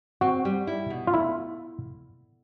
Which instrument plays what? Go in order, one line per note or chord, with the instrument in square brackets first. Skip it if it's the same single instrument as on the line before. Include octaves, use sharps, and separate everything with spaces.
[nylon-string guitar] C4 [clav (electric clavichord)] F#4
[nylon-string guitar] G3
E4
B2
[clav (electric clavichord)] F4
[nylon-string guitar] A3 [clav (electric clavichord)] E4